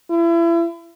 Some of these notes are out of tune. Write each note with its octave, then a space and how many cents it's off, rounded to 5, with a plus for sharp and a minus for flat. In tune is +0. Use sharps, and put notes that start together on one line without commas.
E4 +35